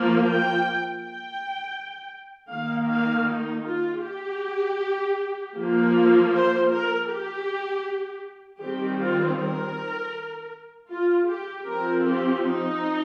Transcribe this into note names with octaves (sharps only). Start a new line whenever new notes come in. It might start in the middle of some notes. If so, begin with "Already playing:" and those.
Already playing: F3 A#3
G5
G5
D#3 A#3 F5
F5
D#4
F4
G4
F3 A#3
C5
A#4
G4
D#3 G3 C4 G4
F4
A#4
F4
G4
F3 C4 A#4
G4
D#4